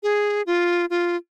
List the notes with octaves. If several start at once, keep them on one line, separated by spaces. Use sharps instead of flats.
G#4
F4
F4